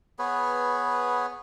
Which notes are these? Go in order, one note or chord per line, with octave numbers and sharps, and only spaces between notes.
B3 G#4 B4 C#5